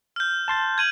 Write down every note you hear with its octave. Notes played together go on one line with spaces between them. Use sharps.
F6 G6
A5 C6 A6
G#6 D#7 F#7